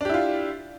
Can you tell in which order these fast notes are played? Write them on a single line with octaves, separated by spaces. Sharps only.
D4 G4 E4 F4